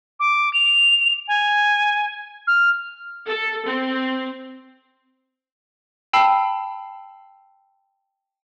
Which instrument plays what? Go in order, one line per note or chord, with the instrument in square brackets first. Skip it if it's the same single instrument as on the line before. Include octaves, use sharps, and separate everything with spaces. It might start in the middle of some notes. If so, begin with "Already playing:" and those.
[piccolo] D6
F7
G#5
F6
[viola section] A4
C4
[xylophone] G5 A5 B5 E6 C7